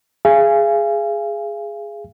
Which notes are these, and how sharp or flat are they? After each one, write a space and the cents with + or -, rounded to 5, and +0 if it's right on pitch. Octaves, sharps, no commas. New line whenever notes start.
G#4 +0 F5 -35 G#5 -10